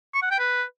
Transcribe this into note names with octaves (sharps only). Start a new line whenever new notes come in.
C#6
F#5
G5
B4